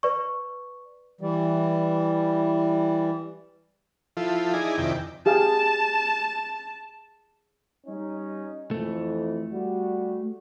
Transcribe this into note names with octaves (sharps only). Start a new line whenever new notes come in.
B4 D5 C#6
E3 G3
F3 E4 F4 A4
D#4 E4 G#4 D5 G#5
F2 C3 D#3 E4 D5 G5
G4 G#4 F5 A5
G3 C#4 D#4
F2 E3 A3
G3 F#4